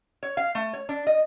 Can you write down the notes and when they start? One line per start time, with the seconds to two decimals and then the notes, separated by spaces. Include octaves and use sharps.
0.23 C#5
0.37 F5
0.55 A3
0.73 C#5
0.89 D4
1.07 D#5